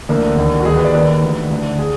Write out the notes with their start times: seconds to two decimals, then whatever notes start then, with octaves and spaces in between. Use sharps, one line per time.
0.09 D2 D3 A#3
0.37 D#2 D3
0.60 F#4
0.65 D#2 D#3 G#4
0.76 B4
0.84 D5
0.94 D#2 D#3 B4
1.22 D2 D3
1.50 D2 D3
1.79 G#4